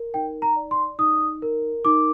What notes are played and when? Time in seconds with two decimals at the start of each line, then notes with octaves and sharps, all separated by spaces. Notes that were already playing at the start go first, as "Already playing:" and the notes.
Already playing: A#4
0.14 D#4 G5
0.42 A#5
0.56 D5
0.71 C6
0.99 D#4 D#6
1.42 A#4
1.85 D#4 D6